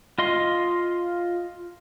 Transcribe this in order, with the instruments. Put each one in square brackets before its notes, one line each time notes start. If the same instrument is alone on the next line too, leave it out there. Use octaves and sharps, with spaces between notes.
[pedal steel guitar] F4 D#5 C6